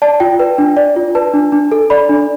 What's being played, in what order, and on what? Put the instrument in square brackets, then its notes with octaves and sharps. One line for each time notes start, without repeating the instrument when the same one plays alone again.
[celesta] D5 A5
F4 G5
B4
D4
D5
F4
B4 A5
D4
D4
A4
D5 B5
D4